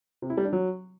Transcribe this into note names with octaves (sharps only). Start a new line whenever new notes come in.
C3
E4
G3
D4
F#3